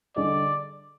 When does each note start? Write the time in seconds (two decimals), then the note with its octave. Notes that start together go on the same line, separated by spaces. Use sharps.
0.16 D3 G3 D4 G#4 D5 D#5